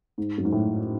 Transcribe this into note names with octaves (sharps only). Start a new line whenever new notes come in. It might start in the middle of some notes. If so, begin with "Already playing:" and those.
G#2
F#2
G#2
A2